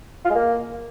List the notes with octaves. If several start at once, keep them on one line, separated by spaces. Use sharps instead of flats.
F4
G#3
A#3